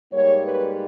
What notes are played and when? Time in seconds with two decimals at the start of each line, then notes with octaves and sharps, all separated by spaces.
0.13 G#2 G3 A#3 C#5
0.42 B4